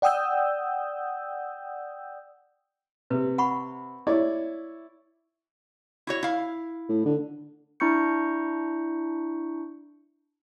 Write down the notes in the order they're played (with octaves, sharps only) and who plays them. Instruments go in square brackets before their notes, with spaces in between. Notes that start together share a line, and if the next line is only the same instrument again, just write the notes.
[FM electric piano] D5 F#5 G5 D#6 E6 G6
[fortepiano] C3 [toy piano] B4
[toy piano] F#5 B5 C#6
[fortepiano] E4 C#5 D5
[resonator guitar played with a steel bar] E4 F#4 C#5
E4 F5
[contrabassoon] A2
D3
[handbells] D4 E4 A#5 C#6 G6 C#7